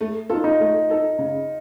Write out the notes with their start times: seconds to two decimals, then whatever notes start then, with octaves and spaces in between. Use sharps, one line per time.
0.01 A3
0.30 D#4 F4 A4
0.44 D#4
0.60 A3
0.90 D#4 A4
1.18 C#3